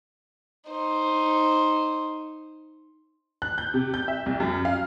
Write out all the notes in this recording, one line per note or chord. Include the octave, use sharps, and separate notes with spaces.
D#4 C5
F#6
G6
C3
G6
E5
C2
F#2
F5